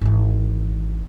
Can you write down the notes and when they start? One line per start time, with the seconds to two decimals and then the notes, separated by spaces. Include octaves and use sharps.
0.01 G#1 E3